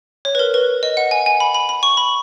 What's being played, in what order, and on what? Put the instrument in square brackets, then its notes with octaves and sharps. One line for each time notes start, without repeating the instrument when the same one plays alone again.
[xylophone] C#5
B4
A#4
B4
D#5
F#5
G#5
G#5
B5
B5
B5
C#6
B5